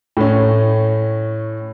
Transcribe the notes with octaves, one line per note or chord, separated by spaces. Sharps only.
A2 C#4